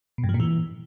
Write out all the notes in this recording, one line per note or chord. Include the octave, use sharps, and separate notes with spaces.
B2
G2
F3
A#2
E3